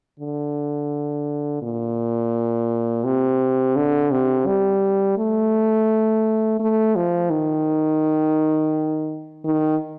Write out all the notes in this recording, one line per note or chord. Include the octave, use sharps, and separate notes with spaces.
D3
A#2
C3
D3
C3
G3
A3
A3
F3
D#3
D#3